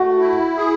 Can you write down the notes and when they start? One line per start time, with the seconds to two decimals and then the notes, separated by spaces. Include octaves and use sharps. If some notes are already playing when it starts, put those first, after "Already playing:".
Already playing: A3 F#4
0.20 E4
0.57 G#4